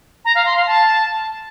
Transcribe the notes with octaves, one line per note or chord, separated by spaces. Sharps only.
A#5
F5
C6
F5
A5